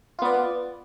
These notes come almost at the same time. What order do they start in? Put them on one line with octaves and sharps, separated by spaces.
F4 B3 D5